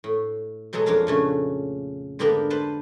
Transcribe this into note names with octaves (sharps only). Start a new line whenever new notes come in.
A2
B2 F#3 G#3 A4 A#5
F2 D4 A#4 F5 A#5
A#2 C#3 A3
G#2 D3 A#3 B3 G4 A#4
B4 C5 A5